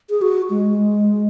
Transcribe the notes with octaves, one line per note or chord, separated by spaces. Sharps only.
G#4
F#4
G#3